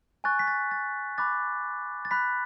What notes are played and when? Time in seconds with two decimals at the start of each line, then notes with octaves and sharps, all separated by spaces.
0.24 G#5 C#6 F#6 A6
0.39 B6
0.48 A6
0.71 A6
1.18 B5 D6 F#6 A6
2.05 A6
2.11 B5 F#6 B6